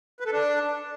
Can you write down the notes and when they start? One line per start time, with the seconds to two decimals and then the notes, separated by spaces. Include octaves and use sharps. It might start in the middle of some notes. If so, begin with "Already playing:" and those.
0.20 B4
0.26 A4
0.32 D4